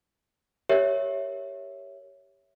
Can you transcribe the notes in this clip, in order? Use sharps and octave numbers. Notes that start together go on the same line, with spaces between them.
G4 A#4 C#5 E5